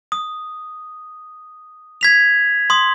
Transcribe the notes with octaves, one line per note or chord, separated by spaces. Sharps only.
D#6
G#6 B6 F7
C6 D#6